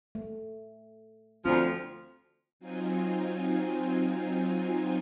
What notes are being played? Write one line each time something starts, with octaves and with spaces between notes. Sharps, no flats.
A3
D2 F3 C4 F4
F#3 C4 D#4 F4 G#5